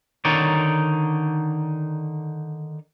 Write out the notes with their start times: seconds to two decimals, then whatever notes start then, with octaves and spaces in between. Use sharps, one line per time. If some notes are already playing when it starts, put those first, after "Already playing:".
0.25 D3 D#3 D#4 C#5 D5